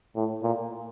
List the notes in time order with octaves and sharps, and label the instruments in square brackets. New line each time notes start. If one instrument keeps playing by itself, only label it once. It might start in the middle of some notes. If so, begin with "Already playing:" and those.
[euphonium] A2
A#2